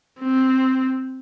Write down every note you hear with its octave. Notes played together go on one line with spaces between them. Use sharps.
C4